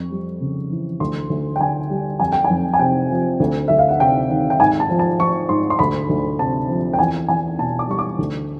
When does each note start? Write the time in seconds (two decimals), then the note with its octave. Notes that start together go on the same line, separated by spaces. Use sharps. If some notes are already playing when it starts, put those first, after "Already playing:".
Already playing: F2 C#6
0.11 G3
0.41 C#3
0.71 E3
1.00 D2 C6
1.30 D2
1.56 G5
1.60 D3 G#5
1.90 G3
2.20 F2 G#5
2.32 G5
2.44 G#5
2.50 F2
2.74 G#5
2.79 C3 G5
3.10 F3
3.40 D2
3.68 D2 E5
3.79 F5
3.89 F#5
3.99 C3 G5
4.29 D#3
4.50 G5
4.59 G#2 G#5
4.80 A5
4.89 F3
4.99 A5
5.19 F3 C#6
5.49 G#2 C6
5.70 C6
5.79 D2 B5
6.09 D2
6.39 C3 A5
6.69 F3
6.93 G5
6.99 E2 G#5
7.28 E2 G#5
7.59 B2 A5
7.79 D6
7.89 G3 C#6
7.99 D6
8.18 D2